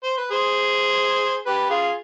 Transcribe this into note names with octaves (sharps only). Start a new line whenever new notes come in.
C5
B4
G#4 C5
G4 B4
F4 G#4